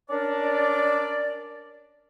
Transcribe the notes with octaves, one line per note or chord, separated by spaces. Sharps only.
C#4 D4 A#4 D5